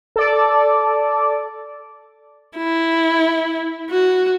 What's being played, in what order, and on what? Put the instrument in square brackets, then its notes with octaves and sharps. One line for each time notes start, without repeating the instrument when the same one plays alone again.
[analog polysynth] A4 D5
[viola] E4
F#4